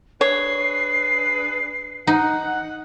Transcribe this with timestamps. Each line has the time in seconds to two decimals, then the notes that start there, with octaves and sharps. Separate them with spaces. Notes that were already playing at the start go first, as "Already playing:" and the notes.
0.21 D4 G#4 B4 C#5 C7
2.07 D#4 F#5